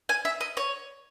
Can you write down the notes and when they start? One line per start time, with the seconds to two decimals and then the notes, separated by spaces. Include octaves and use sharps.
0.09 G#5
0.25 E5
0.41 D#5
0.57 C#5